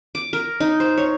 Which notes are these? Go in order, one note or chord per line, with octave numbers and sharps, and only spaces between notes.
D6
A#4
D#4
C5
C#5